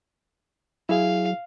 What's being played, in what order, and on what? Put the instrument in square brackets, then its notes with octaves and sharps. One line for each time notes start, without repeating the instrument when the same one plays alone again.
[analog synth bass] F#3 [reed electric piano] E4 G#4 [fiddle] F5